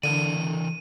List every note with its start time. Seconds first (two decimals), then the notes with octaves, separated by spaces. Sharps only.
0.03 D3 E3 A#4 D5 D#7